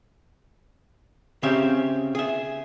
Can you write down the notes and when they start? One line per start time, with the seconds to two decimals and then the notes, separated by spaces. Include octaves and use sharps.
1.43 C#3 C4 C#4 G4 E5
2.15 G#4 E5